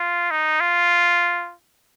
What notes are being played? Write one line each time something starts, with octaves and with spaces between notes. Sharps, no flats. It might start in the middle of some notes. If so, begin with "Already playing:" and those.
Already playing: F4
D#4
F4